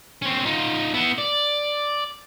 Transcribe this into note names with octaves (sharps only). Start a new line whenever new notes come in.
C4 C#4
D#4 F4
B3 E4
D5